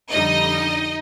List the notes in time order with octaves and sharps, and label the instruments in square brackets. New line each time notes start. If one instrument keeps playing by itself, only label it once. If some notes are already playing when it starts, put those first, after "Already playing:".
[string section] F2 D3 G3 D#4 D#5